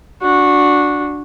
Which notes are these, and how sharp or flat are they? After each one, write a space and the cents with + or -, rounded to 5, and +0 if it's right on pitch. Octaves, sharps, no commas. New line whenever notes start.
D4 +0 F#4 -15